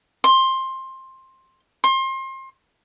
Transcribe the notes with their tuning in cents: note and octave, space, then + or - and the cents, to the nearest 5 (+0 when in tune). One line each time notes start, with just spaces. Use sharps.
C6 +15
C6 +30